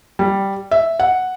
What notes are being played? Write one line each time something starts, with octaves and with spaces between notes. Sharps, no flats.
G3
E5
F#5